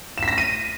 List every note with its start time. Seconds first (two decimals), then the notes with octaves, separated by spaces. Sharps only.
0.18 E7
0.23 B6
0.28 A#6
0.33 B6
0.38 D#7